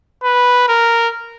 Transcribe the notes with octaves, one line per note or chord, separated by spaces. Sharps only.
B4
A#4